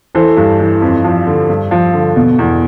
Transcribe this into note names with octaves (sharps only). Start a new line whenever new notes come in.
E3 A4 C5
G2
E3
F2
F3
D3
G2
F3
D3
B2
E2